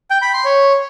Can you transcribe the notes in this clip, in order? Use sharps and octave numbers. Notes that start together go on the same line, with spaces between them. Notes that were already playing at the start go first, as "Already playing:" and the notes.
G5
B5
C6
C#5